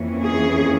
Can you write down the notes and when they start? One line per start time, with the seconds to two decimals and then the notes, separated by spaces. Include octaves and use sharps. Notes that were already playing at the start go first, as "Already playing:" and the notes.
Already playing: F2 E3 A#3 C#4
0.22 G#4